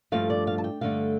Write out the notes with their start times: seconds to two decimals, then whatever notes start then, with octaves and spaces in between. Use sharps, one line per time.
0.12 G2 F3 A3 F5
0.30 D5
0.47 F5
0.58 A5
0.64 G5
0.81 G2 D3 A3 F5